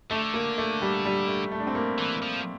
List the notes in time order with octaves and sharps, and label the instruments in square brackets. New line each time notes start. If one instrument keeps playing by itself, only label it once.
[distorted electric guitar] D3 [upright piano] A3
[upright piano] A#3
A3
G3
G3
A3
A3
D4
C4
A#3
[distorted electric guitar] E3
F3